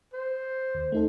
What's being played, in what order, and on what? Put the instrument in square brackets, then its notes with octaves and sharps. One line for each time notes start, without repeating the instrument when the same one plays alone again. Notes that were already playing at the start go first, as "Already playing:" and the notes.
[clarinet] C5
[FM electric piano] D#2
A3 D#4 A4